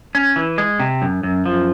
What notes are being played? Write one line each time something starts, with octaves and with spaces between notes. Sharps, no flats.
C#4
E3
G#3
C3
F#2
F#2
F3